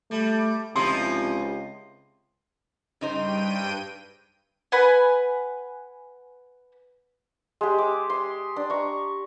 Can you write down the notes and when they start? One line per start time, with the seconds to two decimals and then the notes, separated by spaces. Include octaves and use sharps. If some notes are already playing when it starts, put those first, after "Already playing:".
0.11 G3 A3
0.76 C#2 C3 F3 D#4 E4 C6
3.01 G2 C#3 D#4 C5 G5 D#7
4.72 B4 F#5 G#5
7.61 G#3 G4
7.78 D6
8.10 C6
8.56 D4
8.70 A#5 C#6